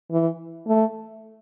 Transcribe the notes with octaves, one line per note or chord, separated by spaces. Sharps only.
E3
A3